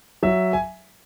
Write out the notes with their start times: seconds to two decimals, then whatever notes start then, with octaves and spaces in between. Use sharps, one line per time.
0.23 F#3 E5
0.53 G#5